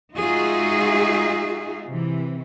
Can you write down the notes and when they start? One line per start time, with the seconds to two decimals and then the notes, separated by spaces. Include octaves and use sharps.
0.16 G#3 D#4 F4 F#4 G#4 E5
1.87 C3 E3